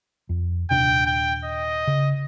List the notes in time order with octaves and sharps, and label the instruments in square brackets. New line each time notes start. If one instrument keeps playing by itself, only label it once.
[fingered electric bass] F2
[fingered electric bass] D#1 C3 D4 [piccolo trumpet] G5
[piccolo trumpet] G5
D#5
[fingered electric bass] C#3